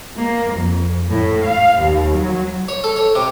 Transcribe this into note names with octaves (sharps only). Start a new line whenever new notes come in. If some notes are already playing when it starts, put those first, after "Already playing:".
A#3
F2
A2
F5
D#2
F#3
C#5
A4
C#5
C3